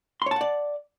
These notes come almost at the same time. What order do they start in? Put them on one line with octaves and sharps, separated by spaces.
C6 C#5 A5 F#5 D5